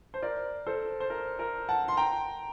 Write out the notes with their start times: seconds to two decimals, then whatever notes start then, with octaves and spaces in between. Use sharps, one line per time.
0.14 C5
0.22 A#4 D5
0.66 A4 C5
1.00 C5
1.10 A#4
1.39 A#4
1.69 F#5 A5
1.88 C6
1.97 G5 A#5